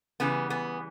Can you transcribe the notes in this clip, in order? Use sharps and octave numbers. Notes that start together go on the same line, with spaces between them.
C#3 E3 G3 B3
B3